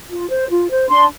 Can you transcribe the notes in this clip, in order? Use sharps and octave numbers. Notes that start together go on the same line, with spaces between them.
F4
C5
F4
C5
D4 C6